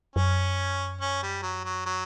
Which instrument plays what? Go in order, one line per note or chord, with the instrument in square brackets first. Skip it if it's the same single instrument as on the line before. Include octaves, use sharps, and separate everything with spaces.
[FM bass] F#2 [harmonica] C#4
[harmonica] C#4
G3
F#3
F#3
F#3